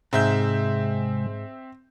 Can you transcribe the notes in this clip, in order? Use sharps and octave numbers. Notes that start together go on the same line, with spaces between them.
G#2 C3 G#3 C4 E5 G6